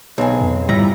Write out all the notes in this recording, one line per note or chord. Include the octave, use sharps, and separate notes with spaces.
B1 C4 G#4
F2
G#2 G3 E4 F4 A#5